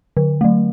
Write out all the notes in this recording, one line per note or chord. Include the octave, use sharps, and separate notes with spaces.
D3
F#3 A3